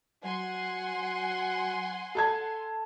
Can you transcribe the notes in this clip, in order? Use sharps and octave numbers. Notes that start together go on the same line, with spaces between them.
F#3 F#5 G#5 C6
A4 A5 G#6